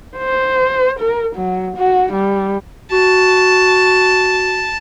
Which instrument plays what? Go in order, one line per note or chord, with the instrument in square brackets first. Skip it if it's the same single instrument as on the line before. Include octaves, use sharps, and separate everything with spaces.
[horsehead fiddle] C5
A#4
F#3
F#4
G3
[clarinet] F#4 [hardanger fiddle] A5